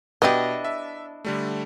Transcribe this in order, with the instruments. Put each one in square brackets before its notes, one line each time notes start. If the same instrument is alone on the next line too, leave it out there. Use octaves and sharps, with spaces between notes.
[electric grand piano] B2 [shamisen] B3 G4 [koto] D4 E4 D#5
[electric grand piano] E5
D3 G3 A3